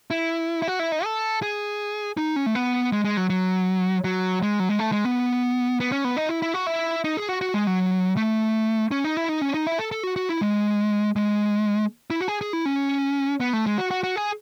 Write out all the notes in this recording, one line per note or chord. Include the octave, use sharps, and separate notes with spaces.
E4
E4
F#4
E4
D#4
A4
G#4
D#4
C#4
A3
B3
G#3
G#3
F#3
F#3
F#3
G#3
F#3
G#3
A3
G#3
B3
B3
C#4
B3
D#4
E4
E4
F#4
E4
D#4
G#4
F#4
F#4
G#3
F#3
A3
C#4
D#4
E4
D#4
C#4
D#4
E4
A4
A4
F#4
F#4
E4
G#3
G#3
E4
F#4
G#4
G#4
E4
C#4
B3
A3
G#3
F#4
F#4
F#4
G#4